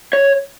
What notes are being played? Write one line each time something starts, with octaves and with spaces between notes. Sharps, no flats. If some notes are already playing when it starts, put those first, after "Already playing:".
C#5